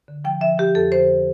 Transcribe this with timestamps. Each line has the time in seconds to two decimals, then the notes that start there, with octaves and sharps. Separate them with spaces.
0.08 D3
0.25 F3 G5
0.41 F3 E5
0.58 F3 G4
0.75 F2 A4
0.92 D3 C5